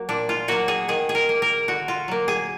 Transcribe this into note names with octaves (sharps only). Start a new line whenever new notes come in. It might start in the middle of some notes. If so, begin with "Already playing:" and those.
Already playing: F#3 A#3
A#2 D4
F4
F#3 A#3 F#4
G#4
D#3 G#4
G#4
A#4
A#3
A#4
D3 F#4
F4
F#3 A#3
G#4